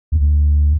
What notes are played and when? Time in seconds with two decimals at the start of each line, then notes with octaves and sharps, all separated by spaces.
0.12 D2